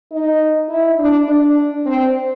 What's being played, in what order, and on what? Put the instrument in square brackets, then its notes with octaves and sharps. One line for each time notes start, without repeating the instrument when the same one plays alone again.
[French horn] D#4
E4
D4
D4
C4